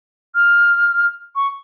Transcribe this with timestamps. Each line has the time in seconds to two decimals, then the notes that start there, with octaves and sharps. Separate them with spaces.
0.35 F6
1.35 C#6